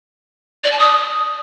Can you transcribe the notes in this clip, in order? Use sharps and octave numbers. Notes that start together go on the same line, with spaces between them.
D5
A5
D#6